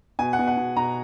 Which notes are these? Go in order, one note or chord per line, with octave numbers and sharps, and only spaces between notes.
B2 G#5
F#5
B2
F#5
B2
B2 A#5